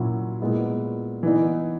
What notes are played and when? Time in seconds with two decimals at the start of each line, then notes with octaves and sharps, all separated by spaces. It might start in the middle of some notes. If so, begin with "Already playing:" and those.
Already playing: A#2 F#3 C#4 E4
0.40 A#2 G#3 B3 E4
1.23 E3 B3 D#4